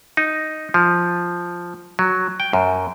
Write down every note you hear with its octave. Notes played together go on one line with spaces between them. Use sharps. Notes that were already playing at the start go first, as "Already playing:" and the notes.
D#4
F3
F#3
G5
F#2